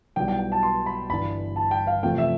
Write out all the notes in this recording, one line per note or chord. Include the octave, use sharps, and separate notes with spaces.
B1 B2 G3 B3 E4 G5
G5
G5
A5
C6
B5
G1 G2 E3 B5
A5
G5
F5
E2 C3 F3 A3 G5
E5